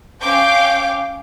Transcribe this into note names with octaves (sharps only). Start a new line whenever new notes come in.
C#4 F5 G5 D6 G6